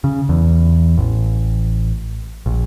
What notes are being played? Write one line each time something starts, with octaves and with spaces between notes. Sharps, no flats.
C#3
E2
A1
A#1